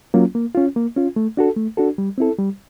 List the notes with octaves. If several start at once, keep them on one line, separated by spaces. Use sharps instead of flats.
F#3 A#3 C#4 F4
A#3
C#4 F4
A#3
C#4 F4
A3
D4 F#4 A4
A3
D4 F#4 A4
G3
C4 E4 A4
G3